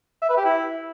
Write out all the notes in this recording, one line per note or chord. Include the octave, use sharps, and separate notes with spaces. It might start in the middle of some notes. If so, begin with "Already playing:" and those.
E5
B4
G4
E4